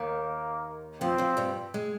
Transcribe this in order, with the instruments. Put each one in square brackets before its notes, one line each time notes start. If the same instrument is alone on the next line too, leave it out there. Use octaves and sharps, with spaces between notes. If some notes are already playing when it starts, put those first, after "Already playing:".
Already playing: [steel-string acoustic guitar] D#2 D#3 [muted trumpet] A#3
[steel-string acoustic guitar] F2 F3 [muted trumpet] C4
[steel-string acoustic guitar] F2 F3
G2 G3
G#3